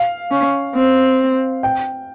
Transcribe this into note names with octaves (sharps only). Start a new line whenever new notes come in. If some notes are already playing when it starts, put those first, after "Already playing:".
Already playing: F5
C#4
C4
G5